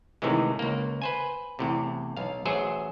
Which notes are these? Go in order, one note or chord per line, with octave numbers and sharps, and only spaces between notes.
A2 C3 D#3 E3 G#3
C#2 A#3
B4 C5 G#5
E2 A2 C3
B1 F5
A1 F#3 G#4 C5 E5